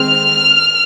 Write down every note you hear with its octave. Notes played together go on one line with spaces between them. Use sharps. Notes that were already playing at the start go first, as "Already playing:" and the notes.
Already playing: D#3 G#3 C4 F6